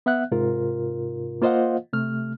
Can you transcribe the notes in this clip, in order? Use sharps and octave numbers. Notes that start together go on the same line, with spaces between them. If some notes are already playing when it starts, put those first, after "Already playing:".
B3 E5 F#5 F#6
G#2 C3 F4 A#4
A#3 F4 C5 D#5 F5 F#5
C3 A3 F6